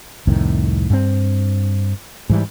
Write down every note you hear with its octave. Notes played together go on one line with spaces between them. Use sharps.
C2 F2 A2 D#3
G2 C4
G#2 E3 G3